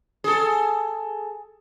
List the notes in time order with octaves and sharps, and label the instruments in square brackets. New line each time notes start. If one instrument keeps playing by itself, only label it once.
[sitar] G#4 A4